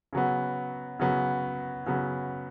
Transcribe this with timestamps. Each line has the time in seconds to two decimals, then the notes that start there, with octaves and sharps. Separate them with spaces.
0.13 C#3 F#3 B3
0.99 C#3 F#3 B3
1.86 C#3 F#3 B3